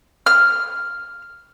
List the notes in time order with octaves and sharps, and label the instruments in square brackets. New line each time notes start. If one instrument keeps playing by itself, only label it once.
[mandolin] F6